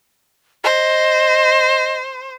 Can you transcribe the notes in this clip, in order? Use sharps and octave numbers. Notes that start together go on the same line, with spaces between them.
C5 D#5